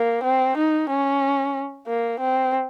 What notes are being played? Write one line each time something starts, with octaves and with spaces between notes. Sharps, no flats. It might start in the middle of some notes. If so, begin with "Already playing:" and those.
Already playing: A#3
C4
D#4
C#4
A#3
C4